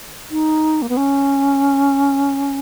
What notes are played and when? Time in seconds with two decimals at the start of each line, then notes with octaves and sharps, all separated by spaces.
0.31 D#4
0.82 A#3
0.89 B3
0.97 C#4